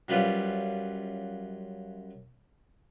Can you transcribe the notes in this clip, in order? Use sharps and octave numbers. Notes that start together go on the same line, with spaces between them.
F#2 G3 F4 B4